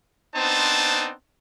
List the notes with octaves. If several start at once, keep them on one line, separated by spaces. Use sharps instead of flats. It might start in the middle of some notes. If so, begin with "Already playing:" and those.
B3 C4 D4 D#4 C5 A5